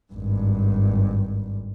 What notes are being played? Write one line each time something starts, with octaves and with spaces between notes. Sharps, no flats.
G#1 G2